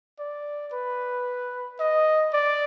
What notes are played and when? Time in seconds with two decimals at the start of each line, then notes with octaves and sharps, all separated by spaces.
0.19 D5
0.73 B4
1.80 D#5
2.33 D5